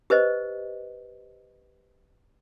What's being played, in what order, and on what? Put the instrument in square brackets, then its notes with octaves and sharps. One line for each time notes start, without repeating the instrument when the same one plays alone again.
[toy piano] G4 B4 C5 D#5